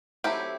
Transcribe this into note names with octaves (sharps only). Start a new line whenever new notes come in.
F#3 A3 C4 E4 G4